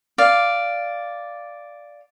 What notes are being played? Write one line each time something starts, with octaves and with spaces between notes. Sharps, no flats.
D5 F5